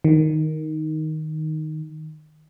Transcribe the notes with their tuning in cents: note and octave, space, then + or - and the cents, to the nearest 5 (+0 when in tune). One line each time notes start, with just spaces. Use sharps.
D#3 +0